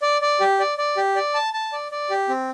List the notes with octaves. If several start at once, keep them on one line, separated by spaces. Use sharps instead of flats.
D5
D5
G4
D5
D5
G4
D5
A5
A5
D5
D5
G4
C4